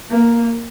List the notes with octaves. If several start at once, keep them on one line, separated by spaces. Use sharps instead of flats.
A#3